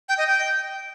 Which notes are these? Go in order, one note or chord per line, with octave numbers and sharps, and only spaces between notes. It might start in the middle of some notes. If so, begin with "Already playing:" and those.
G5
D#5
G5